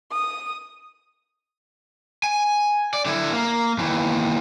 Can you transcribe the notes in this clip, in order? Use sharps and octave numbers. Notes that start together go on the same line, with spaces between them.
D#6
G#5
D5
D3 E4
A#3
D#2 E3